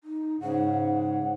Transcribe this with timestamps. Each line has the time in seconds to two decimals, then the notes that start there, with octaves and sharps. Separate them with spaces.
0.04 D#4
0.41 G#2 C#3 F#5